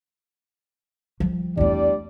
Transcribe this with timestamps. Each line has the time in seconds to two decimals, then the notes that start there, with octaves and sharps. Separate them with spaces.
1.20 F3 G3
1.57 E2 G3 A3 D4 D5